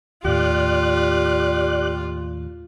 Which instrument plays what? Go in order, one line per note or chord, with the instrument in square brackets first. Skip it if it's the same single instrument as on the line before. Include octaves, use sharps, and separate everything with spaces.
[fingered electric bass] D#2 A2 [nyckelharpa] F4 [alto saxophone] G4 [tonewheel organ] D5 F#6